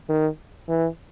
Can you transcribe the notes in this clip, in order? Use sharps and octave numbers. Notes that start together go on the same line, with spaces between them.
D#3
E3